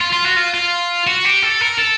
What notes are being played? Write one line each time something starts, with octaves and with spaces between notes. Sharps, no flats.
F4
F4
F#4
F4
F4
F#4
G4
A4
A#4
A4